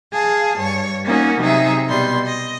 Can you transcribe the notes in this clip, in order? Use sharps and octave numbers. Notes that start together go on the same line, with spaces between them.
G#4 F5 A5
G2 C#5
A#3 C#4 D#4 F#4
C3 F#3 D#4 G#4 E5
B2 G3 C6
D#5